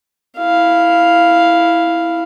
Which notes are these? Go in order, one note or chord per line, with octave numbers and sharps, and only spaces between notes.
E4 F5